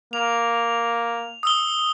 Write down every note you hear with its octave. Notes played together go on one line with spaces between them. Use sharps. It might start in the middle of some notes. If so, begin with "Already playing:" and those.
A#3 F7
D#6 E6 G7